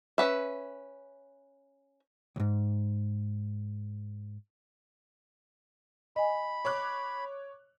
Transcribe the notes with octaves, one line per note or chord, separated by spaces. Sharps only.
C#4 B4 E5
C#2 G#2
D#5 G#5 B5
C#5 D6 F#6